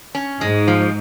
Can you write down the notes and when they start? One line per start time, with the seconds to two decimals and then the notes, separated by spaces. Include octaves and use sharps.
0.15 C#4
0.41 G#2 G#3
0.67 F3